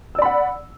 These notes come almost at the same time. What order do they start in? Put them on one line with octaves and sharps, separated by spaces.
E6 D5 B5 F#5